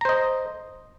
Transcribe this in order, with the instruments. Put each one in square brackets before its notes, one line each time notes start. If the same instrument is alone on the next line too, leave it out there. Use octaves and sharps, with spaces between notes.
[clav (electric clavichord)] A#5
C5
D#5